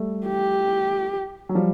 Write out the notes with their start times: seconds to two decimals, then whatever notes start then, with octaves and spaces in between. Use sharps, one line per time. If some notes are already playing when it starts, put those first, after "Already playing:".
Already playing: G3 A3
0.26 G4
1.49 F#3
1.55 F3 G3